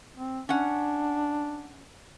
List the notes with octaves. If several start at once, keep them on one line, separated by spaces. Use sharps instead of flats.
C4
C#4 D4 F#5